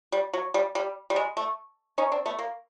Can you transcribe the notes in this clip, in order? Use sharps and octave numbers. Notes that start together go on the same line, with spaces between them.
G3
F#3
G3
G3
G3
G#3
A3
C#4 D#4
C4 D4
A3 B3
A#3